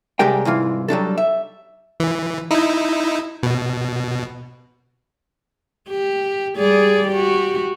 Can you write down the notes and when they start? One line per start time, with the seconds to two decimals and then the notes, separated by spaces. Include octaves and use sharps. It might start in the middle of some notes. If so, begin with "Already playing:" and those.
0.19 C3 G3 G#3 G4 A#4 G5
0.45 C2 G#2 E3 F4
0.88 F#3 G3 D4 A4
1.18 E5
2.00 E3
2.51 D#4 E4
3.43 B2
5.89 G4
6.57 G3 G#4 D5
7.08 F#4 G4